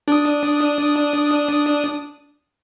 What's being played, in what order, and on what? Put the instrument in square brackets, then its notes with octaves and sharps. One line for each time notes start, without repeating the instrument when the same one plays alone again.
[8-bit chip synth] D4 D#6